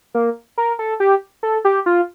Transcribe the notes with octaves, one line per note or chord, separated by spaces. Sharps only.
A#3
A#4
A4
G4
A4
G4
F4